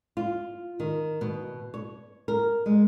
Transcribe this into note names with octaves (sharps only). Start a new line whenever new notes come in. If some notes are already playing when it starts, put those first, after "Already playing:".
F4
D#3
B2
C#5
A#4
G#3